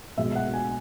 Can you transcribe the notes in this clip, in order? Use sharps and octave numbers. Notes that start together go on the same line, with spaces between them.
B1 B2 G#3 E5
F#5
G#5